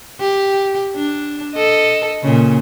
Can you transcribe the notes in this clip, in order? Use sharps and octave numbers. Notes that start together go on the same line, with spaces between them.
G4
D4
A4 D#5
A#2 C#3